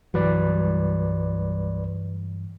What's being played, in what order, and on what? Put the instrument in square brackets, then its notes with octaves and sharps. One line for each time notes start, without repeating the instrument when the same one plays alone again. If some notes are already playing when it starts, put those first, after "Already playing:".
[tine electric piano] C2 B4 D5 [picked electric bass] G2 E3 F#3